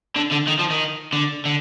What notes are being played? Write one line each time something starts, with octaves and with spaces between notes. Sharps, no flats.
D3
D3
D#3
F3
D#3
D3
D3